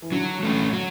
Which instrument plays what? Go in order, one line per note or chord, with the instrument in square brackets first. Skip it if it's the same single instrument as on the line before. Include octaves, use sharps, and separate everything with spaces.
[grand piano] E3
[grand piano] D3 [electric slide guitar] F#3
[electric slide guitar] A3 C#4
F#3